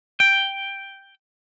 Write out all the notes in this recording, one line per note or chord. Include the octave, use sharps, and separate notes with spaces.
G5